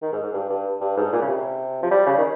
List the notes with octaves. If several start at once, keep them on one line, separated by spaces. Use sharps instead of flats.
D#3
G#2
G#2
G2
G2
G2
G#2
A#2
C#3
C3
F3
G3
C#3
D#3